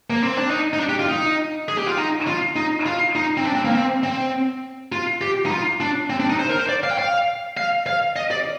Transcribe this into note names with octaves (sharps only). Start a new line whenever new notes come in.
A#3
C4
D4
D#4
D#4
D4
G4
F4
D#4
G#4
G4
F4
D#4
F4
D#4
F4
D#4
C4
D4
C4
A#3
C4
C4
F4
G4
D#4
F4
D4
C4
D4
D#4
C5
A#4
C5
D5
F5
G5
F5
F5
F5
D#5
D5